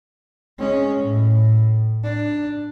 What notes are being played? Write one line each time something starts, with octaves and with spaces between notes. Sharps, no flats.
G#3 C#4
A2
D4